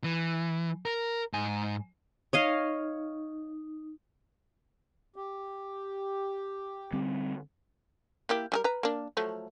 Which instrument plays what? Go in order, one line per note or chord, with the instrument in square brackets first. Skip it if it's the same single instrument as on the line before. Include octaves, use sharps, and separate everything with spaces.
[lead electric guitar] E3
A#4
G#2 G#5
[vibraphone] D#4 [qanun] C#5 D#5 F5
[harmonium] G4
[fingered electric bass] D3 G3 C4
[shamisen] A#3 E4 G4
G3 G#4 A#4
B4 A#5
A#3 D4
F3 F#3 A3